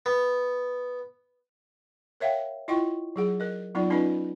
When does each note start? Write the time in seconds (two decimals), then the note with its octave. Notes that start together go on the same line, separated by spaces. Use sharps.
0.06 B3
2.20 A#4 C#5 E5 F5 G5
2.68 E4 F4 D#5 F#5 G5 C#6
3.16 F#3 G#4 F#5
3.40 A#4 D#5
3.75 F#3 B3 D#4 F4 D5
3.90 C#4 D#4 F4 B4 D#5 B5